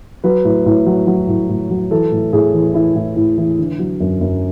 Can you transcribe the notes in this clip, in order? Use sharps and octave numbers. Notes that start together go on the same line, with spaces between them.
F#3 B4
A2
A2
F#3
F#3
A2
A2
F#3
E3 A4
A2
A2 G#4
E3
E3 E4
A2
A2
E3
D3
F#3
F#2
F#2